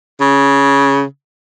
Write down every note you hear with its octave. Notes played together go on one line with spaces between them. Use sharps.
C#3